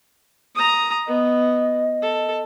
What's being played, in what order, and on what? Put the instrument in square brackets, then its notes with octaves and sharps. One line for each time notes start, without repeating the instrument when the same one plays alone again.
[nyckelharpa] A#5 D#6
[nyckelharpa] B3 [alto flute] D#5
[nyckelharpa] A4